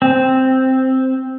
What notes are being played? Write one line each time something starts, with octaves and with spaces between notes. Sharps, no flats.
C4